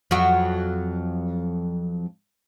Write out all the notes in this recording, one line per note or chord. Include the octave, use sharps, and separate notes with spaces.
F2 F#3 F#4